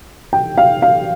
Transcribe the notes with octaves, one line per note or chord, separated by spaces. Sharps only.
G5
F5
F5